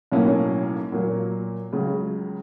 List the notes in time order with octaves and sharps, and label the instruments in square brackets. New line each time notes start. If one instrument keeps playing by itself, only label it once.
[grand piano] B1 A2 F#3 A#3 C#4
A#2 F#3 A#3
C#2 C#3 F#3